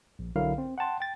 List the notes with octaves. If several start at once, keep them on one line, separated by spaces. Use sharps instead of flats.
A#1
B1 D3 F#3 E4 A#4 F5
C4
F#5 G5 A5 C6
G5 A6